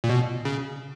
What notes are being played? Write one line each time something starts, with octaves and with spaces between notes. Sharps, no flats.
A#2
B2
C#3